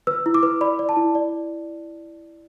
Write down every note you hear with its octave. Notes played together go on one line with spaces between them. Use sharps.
B4 E6
E4
D6
B4
D5 B5
D5
A5
E4
D5